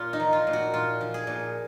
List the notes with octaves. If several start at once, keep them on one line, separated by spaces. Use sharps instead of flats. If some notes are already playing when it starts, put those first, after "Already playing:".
Already playing: A#2 F4
D#4
F3
F4
A#2
F#4
A#2 F4
F3
G#4
A#2